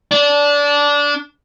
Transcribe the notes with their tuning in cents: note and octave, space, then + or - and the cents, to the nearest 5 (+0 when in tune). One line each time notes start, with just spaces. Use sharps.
D4 -20